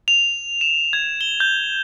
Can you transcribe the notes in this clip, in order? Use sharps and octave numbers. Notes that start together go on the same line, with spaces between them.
F7
E7
G#6
G7
G6